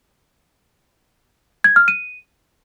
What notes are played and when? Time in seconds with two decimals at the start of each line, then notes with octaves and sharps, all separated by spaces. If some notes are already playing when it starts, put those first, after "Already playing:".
1.64 G#6
1.76 F6
1.88 D#7